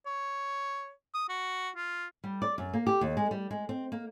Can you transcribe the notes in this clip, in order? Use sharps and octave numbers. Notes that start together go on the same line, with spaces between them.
C#5
D#6
F#4
F4
G3
D5
F#2
A#3
G4
D#2
G#3
G3
G#3
C4
A#3